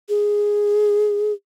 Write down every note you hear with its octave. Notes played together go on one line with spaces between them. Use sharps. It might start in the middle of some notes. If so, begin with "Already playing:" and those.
G#4